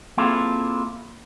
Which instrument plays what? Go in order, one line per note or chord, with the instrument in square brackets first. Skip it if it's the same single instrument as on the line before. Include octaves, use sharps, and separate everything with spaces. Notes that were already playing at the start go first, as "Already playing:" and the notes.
[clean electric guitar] A#3 C4 E4 F4 G#4 A4